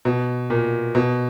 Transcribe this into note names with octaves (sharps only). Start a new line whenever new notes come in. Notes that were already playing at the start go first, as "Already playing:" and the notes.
B2
A#2
B2